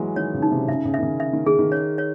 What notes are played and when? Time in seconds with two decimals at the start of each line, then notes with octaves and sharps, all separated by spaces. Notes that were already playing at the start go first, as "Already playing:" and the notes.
Already playing: E3 F#3 G#3
0.16 D#3 C#5
0.34 C#3
0.42 D#4
0.51 C3
0.68 C#3 E5
0.85 C#3
0.94 D#3 E5
1.02 C#3
1.20 E5
1.33 D#3
1.46 D#3 G#4
1.59 D#3
1.72 C#5
1.98 C#5